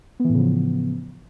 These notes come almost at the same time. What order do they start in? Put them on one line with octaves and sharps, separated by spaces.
B3 E3 A2 C#3 F3